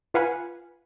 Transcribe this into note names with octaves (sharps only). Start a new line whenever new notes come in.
F4 B4 F5 F#5 G#5 B5